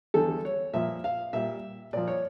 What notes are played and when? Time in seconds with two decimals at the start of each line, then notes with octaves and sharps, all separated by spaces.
0.14 E2 D3 G3 A4
0.45 C#5
0.74 A#2 F3 E5
1.04 F5
1.33 A#2 G3 E5
1.93 A#2 F3 D5
2.08 C#5